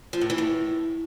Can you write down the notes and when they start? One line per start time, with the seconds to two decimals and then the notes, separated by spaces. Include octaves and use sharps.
0.13 F3
0.21 A2
0.30 E3
0.38 A2